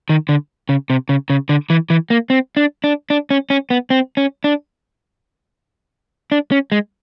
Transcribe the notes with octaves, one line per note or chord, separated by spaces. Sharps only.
D#3
D3
C#3
C3
C#3
C#3
D3
E3
E3
A#3
C4
D4
D4
D4
C#4
C#4
B3
C4
C#4
D4
D4
C#4
G#3